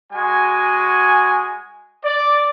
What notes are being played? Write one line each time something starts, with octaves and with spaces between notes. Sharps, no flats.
G#3 F#4 G#5
D5